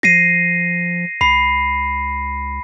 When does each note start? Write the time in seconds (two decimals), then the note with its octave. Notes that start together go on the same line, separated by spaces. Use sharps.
0.03 F3 A#6 C7 D#7
1.21 C#2 B5 C7